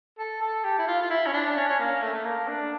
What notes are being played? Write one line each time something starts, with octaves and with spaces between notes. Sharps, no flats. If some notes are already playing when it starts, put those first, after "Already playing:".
A4
A4
G4
E4
F4
F4
E4
C#4
D4
C#4
C#4
A#3
A3
A3
A#3
D4